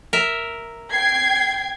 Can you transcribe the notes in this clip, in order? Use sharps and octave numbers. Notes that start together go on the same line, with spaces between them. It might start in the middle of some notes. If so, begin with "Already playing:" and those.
A#4 E5
G5 G#6 C7